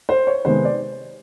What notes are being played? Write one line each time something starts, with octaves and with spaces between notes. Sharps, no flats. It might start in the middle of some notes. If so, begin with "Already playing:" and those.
C5
C#5
C3 D#3 G#3 B3 C5
D5